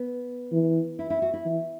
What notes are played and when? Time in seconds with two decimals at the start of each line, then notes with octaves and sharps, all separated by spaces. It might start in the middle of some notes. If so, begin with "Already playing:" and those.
Already playing: B3
0.52 E3
0.99 E4
1.10 E4
1.22 F#4
1.33 E4
1.45 E3